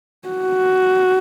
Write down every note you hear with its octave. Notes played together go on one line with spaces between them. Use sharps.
F#4